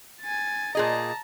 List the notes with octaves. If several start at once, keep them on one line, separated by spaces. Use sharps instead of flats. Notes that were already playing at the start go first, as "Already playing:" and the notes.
G#5 A6
A#2 G#4 D#5 A5 A#5